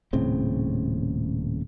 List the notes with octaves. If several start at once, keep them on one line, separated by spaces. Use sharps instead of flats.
D#1 A2 C#3 C4